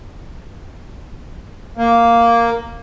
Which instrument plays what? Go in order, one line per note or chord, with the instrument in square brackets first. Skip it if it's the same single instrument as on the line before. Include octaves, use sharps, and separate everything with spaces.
[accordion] A#3